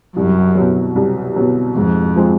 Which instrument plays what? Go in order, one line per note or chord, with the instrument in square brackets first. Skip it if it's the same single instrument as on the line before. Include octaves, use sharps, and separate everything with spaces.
[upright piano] C2 [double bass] F#2
[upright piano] B2 F#3
C2
B2 F#3
[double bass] F2 [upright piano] G#2
[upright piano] F3 G#3 C4